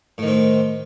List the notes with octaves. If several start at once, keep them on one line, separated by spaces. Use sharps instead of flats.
A2 D#3 C4